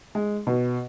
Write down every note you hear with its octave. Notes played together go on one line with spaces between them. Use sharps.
G#3
B2